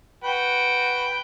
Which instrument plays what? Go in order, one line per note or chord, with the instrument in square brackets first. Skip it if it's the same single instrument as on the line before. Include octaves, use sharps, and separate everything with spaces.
[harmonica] F#4 B4 G5